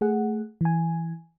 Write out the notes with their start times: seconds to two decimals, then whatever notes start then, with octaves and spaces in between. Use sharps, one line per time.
0.01 A3 G#4 F#5
0.61 E3 G#5